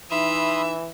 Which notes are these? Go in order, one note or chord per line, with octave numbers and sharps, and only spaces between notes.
E3 D#4 E5 B5 C6 D#6